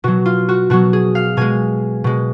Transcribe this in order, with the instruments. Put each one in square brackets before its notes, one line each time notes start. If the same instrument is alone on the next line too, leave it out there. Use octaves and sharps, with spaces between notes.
[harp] B2 F#3 F#4
F4
F#4
B2 F#3 F#4
G#4
F5
B2 G#3 G#5
B2 G#3